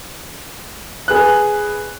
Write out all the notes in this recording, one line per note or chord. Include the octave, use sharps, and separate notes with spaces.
G#4 B4 F#6